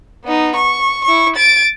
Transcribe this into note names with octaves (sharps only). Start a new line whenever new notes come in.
B3 D#4
C#6
E4 C#6
A6 D7